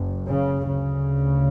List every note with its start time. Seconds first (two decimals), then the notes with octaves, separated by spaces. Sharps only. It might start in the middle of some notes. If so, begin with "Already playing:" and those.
Already playing: F#1 F#2
0.28 C#3
0.69 D2 C#3